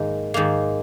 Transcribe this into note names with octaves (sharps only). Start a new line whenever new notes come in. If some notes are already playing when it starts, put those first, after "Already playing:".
Already playing: G#2 D#3 A#3
G#2 D#3 A#3